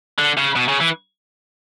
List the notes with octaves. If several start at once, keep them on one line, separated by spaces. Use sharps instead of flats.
D3
C#3
B2
C#3
E3